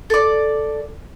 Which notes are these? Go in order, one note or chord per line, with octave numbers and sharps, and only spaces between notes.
A4 D5